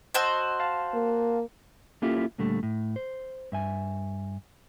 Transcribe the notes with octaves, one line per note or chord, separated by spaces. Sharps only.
F#4 C5 D#5 A5 E6
F5 A5
A#3
A#3 C#4 E4 F4 G4 A4
D2 A#2 D3 G3 A3
A2
C5
G2 E5 G#5